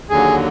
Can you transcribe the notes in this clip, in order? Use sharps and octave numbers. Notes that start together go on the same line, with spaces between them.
D#2 D3 F#3 G#4